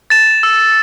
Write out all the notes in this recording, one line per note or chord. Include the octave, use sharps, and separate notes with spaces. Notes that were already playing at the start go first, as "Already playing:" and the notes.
A6 E7
E6